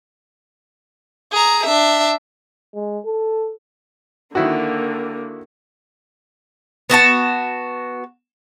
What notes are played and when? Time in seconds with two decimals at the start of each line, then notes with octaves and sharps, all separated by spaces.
1.32 G#4 A#5
1.66 D4 E5
2.75 G#3
3.05 A4
4.35 D3 D#3 A#3 E4 F#4
6.90 B3 F#4 G4 A5